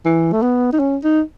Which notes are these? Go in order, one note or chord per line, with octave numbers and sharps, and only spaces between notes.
E3
A3
B3
D#4
C#4
D#4